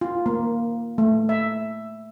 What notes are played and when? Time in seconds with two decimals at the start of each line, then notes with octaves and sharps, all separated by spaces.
0.01 F4
0.26 A#3
0.98 A3
1.29 E5